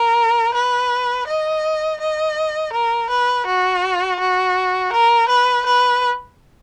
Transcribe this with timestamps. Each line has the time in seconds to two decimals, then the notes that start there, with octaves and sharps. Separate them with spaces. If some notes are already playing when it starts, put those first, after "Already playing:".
Already playing: A#4
0.54 B4
1.27 D#5
2.01 D#5
2.73 A#4
3.10 B4
3.46 F#4
4.20 F#4
4.93 A#4
5.29 B4
5.66 B4